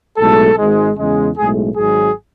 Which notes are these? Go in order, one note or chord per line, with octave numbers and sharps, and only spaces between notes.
B1 A2 G#3 A4
G#1 G#2 G#3
E2 C#3 G#3
B1 A2 G#3 G#4
G#1 G#2 F#3 G#4